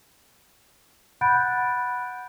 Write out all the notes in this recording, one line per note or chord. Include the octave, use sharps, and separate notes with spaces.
F#5 B5 F#6 G6 A6 D7